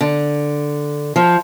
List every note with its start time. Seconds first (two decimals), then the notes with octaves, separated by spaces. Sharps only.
0.01 D3
1.16 F3